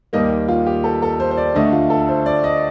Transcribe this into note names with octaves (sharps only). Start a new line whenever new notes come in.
D#2 D#3 G3 A#3 D#5
F4
G4
A4
A4
C5
C5
D5
D2 D3 A3 D#5
F4
A4
C5
D5
D#5